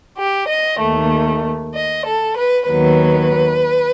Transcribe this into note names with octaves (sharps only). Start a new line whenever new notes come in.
G4
D#5
D#2 D#3 A3
D#5
A4
B4
D#2 D#3 F#3 B3 B4